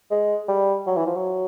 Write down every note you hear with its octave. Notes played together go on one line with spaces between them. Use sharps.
G#3
G3
F#3
E3
F3
F#3